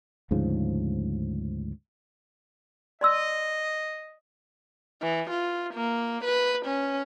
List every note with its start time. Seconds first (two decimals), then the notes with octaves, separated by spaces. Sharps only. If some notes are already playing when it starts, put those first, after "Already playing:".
0.31 D2 G#2 C#3 F3
3.01 D5 D#5 C6 E6
5.02 E3
5.31 F4
5.74 A#3
6.25 B4
6.66 C#4